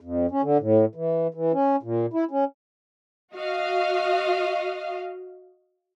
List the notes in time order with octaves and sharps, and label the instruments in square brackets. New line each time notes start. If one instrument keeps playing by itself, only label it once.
[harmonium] F2
C#4
D3
A2
E3
E3
C#4
A#2
E4
C#4
[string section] F#4 D#5 F5